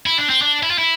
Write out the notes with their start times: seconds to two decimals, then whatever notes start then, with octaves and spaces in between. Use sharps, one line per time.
0.06 E4
0.18 D4
0.30 C4
0.42 D4
0.63 E4
0.71 F4
0.78 E4